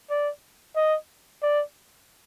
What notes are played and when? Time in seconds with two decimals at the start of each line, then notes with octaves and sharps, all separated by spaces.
0.10 D5
0.76 D#5
1.42 D5